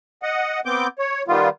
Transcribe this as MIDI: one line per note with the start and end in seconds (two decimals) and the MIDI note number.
0.23 0.60 75
0.23 0.60 78
0.65 0.87 59
0.65 0.87 60
0.65 0.87 86
0.65 0.87 91
0.99 1.23 73
1.28 1.49 51
1.28 1.49 55
1.28 1.49 59
1.28 1.49 65